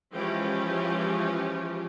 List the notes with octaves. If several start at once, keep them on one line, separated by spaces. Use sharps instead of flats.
E3 F3 G#3 C#4 G4